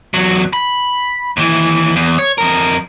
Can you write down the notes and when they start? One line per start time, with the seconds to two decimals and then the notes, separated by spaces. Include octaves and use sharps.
0.14 E2 F#3
0.53 B5
1.37 D#2 E3
1.96 E2
2.18 C#5
2.38 F2 A#4